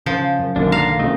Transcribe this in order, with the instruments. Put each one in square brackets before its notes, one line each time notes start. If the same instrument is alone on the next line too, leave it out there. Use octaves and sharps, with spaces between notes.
[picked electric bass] C#3 [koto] F3 [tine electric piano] G6
[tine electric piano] F#2
[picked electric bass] B1 D#3 [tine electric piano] F#2 [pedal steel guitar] D3 A#3 D4
[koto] F5 [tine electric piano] A#5
[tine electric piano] A#2 C#3 D#5 [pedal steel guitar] A3 C4